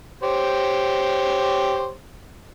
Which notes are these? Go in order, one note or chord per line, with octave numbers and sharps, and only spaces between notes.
G4 C5 C#5